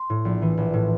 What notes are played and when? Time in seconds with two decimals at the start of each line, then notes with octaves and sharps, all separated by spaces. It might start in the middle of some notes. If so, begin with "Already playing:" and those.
Already playing: C6
0.10 A2
0.25 A#1
0.42 E3
0.57 A#1
0.74 A2